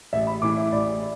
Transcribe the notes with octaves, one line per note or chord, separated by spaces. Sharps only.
A1 E5
B5
A2 E3 D6
E5
A1 D5